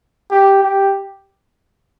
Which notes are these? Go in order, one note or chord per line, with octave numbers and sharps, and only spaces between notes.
G4
G4